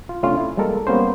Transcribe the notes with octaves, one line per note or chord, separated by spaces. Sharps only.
F4
C3 A3 C#4 D4 F4
E4
G3 G#3 A#3 A4 A#4
G3 A#3 B3 C#4 C5